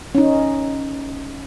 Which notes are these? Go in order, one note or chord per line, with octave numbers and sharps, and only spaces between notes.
C#4 D#4